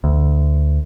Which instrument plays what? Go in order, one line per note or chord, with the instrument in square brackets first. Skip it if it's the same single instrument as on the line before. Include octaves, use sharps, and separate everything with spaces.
[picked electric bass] D2